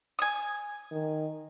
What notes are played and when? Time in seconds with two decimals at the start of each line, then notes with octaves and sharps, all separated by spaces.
0.19 G#5 D#6
0.91 D#3